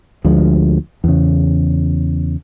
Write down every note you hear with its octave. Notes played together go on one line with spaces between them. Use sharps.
D2 F3 G#3
E2 C#3